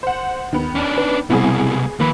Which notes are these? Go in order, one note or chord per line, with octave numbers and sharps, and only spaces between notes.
C5 F#5
D#2 D#3 B3
C#4 D4
B4
C2 B2 G3 B3 C4 E4 G#4
D#3 F3 A#3 B4